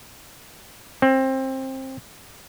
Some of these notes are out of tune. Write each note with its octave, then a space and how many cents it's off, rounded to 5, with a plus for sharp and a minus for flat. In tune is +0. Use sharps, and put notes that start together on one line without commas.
C4 +20